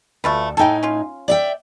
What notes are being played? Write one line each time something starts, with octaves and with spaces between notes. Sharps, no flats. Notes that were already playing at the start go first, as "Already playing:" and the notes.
D2 A3 F4 B4
A2 D#4 A4 G5 G#5
C#4 F4
D5 E5 G5